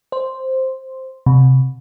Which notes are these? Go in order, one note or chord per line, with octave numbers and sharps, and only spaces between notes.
C5
C3